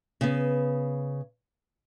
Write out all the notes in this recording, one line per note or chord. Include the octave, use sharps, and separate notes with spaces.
C#3 B3